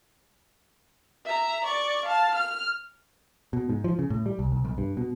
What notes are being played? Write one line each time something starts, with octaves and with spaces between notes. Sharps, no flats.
E5 A#5
D5 C#6
F5 A5
F6
B2
G#2
F3
C#3
A2
G3
C2
C2
B1
G2
B2